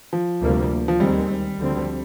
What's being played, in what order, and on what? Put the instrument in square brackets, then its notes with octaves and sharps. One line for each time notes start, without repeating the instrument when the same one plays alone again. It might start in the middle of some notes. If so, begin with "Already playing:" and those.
[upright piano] F3
[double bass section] D2 C3 G3 A#3
[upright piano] F3
[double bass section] D#2 D#3 G#3 C4 [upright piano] G3
[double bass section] D2 D3 F3 C4